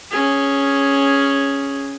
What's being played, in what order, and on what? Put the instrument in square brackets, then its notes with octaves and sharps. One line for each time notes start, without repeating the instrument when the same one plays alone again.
[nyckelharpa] C#4 G#4